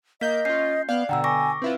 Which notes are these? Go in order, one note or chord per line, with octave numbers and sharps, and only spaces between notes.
A#3 D#5 G6 B6
C#4 F4 G6 C7
B3 D5 F5 G5 F#6
B2 D3 F#5 G5 A#5 E6
G#5 C#6 D6 A#6
C4 E4 F4 B4